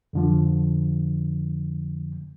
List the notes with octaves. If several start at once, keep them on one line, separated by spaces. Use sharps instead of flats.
F2 D3 F3